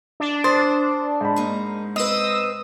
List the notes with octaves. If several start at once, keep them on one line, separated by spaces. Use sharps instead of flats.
D4
C5 C6 D#6 A6
G#2 B5
A#3 D#4
C4 B4 D#5 D#6 E6